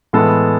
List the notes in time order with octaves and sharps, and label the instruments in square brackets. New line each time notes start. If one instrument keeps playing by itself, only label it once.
[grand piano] A2 E3 G#3 B3 A4